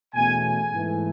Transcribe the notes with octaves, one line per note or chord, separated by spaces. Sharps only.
E2 B2 A3 C#4 G#5
G#5
G#2 E3 A3